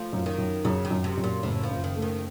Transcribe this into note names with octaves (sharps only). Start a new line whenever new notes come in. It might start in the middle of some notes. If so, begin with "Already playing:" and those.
Already playing: F3 A3
F#2
D#3
F#2
F#2 C#3
D#3
F#2
C3
F#2
A#2
F#1 A2
F3
F#1
D#3
A3
D#3